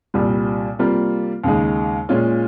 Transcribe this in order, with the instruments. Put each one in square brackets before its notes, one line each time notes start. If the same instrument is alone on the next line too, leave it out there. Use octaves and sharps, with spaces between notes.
[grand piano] C2 A#2 G3
C3 G3 A#3 F4
D#2 C#3 G#3 D#4
A#2 G#3 C#4 F4